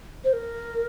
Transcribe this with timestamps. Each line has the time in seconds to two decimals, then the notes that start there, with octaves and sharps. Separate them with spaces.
0.24 C5
0.33 A#4